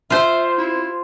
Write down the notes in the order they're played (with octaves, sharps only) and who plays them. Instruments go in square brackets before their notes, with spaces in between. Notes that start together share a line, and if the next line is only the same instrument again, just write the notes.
[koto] F4 C5 [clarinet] E5
[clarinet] E4